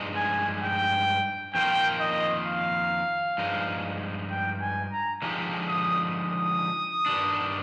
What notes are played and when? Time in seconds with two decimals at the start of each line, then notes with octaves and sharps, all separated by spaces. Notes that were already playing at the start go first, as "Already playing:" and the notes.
Already playing: G2 F3 G#3 D#4
0.16 G#5
0.62 G5
1.54 F2 D#3 A#3 F4 A#4 G5
2.00 D#5
2.46 F5
3.38 G2 F3 G#3 D#4
4.31 G5
4.61 G#5
4.92 A#5
5.22 D3 F3 G#3 D#4 G4
5.68 D#6
6.15 D#6
7.06 G2 D#3 G3 D4